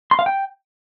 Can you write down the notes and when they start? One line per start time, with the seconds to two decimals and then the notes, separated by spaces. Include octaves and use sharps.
0.11 C6
0.19 F5
0.26 G5